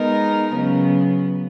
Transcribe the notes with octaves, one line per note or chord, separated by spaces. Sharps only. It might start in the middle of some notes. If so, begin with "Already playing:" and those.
Already playing: G#3 B3 D#4 A#4
C#3 F#3 B3